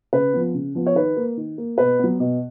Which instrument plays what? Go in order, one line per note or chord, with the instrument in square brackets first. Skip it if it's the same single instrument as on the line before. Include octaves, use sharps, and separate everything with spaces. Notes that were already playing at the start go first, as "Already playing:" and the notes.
[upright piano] C#3 B4
F3 B3
C#3
F3 B3
C#5
D#3 B4
A#3
D#3
A#3
B2 B4
F#3 B3
B2